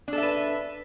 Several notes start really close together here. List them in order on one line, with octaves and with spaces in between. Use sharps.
D4 A4 E5 B4